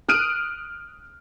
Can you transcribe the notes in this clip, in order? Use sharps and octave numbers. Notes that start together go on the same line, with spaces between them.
D#6 F6 F#6 D7 D#7